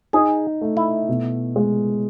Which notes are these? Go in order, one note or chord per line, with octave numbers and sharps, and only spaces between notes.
D#4 G#4
A3
E4
B2
G#3